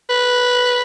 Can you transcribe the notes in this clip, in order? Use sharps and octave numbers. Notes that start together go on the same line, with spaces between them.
B4